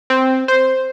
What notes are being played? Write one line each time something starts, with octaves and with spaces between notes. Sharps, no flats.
C4
C5